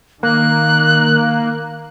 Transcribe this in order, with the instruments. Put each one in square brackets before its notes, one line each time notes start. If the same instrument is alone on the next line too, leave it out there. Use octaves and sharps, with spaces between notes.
[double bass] D#3 [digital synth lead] A#3 [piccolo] F#6